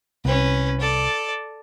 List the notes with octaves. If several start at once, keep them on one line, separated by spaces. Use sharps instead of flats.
C2 C#4 B4
A4 D5